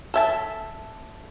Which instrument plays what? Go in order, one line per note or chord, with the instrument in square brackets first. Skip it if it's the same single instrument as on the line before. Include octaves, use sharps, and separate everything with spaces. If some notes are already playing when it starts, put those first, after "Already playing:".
[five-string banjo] A4 E5 A5